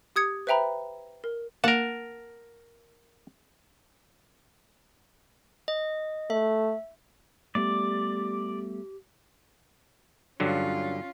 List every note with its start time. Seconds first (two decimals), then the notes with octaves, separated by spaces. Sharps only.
0.16 G4 D#6 G#6 C#7
0.47 B4 C5 E5 G5 A#5 B5
1.24 A#4
1.64 A#3 A#4 F#5 A5
5.68 D#5
6.30 A3 E5
7.55 G3 A3 B3 G4 D5
10.40 G2 D3 F#3 C#4 F4